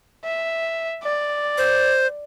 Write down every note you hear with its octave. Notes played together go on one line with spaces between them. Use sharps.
E5
D5
C5